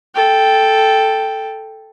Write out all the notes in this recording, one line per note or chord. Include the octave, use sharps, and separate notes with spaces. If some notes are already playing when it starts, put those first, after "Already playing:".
A4 G5